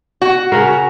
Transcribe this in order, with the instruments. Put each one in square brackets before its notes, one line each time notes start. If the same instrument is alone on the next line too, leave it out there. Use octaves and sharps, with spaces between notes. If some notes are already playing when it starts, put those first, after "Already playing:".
[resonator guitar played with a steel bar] F#4
[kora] C#3 C#4 A#4